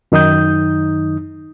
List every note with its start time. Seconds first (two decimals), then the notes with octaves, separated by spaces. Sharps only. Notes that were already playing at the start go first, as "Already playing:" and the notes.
0.12 F#2 D#3 D#4 D#6 G6